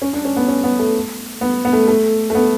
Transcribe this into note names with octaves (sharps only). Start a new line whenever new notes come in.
C#4
D4
C#4
B3
C#4
B3
A3
B3
B3
A3
A3
A3
B3